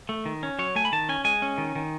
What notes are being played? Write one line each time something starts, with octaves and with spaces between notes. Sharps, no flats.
A3
D#3
C#4
F#3 C#5
A3 G#5
B5
D#3 A5
C#4 G#5
G#3 G#5
C#4
D#3
D#3